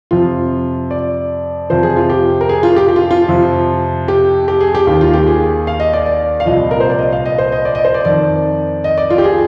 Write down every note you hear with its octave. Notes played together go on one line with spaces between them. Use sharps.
F2 C3 F3 F4
D5
F2 C3 F3 C5
G#4
F4
G4
A#4
G#4
F4
G4
G4
F4
F4
F2 C3 F3
G4
G4
G#4
G4
D#2 D#3 G4
F4
G4
G#4
F5
D#5
D5
D5
F5
C2 A#2 F3 D#5
A#4
C5
D5
D#5
F5
D#5
C5
D#5
D5
D#5
C5
D5
F2 D#3 D5
D#5
D5
F4
G4
G#4